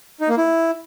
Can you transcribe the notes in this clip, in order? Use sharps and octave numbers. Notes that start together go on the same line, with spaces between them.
D#4
A#3
E4